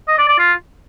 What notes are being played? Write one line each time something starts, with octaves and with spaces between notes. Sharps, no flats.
D#5
D5
D5
F4